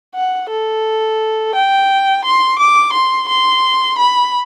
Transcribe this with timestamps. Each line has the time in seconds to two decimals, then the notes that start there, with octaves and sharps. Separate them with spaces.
0.15 F#5
0.50 A4
1.55 G5
2.24 C6
2.59 D6
2.93 C6
3.28 C6
3.98 B5